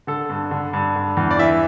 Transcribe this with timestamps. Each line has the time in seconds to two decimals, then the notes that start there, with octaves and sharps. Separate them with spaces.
0.07 D3 A4
0.29 G2
0.51 D3
0.73 G2
0.95 D3
1.17 E2
1.31 D5
1.39 E3 E5